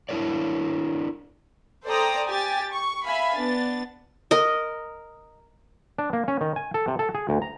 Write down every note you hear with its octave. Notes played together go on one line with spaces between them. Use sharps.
D4 E4 F4 A#4 C#5 D5
A4 C5 D5 G5 A#5 D#6
G4 G#5 A6
C#6
E5 F5 G#5 B5
B3 D4 A6
A#4 D#5
D4
A#3
C#4
D#3
G#5
A4
C3
A4
G#4
D2
A#5